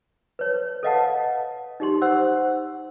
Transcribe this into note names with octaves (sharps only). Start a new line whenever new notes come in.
B4 C#5
A4 B4 D#5 F5 F#5 A5
D#4 G4 C6
C5 F#5 E6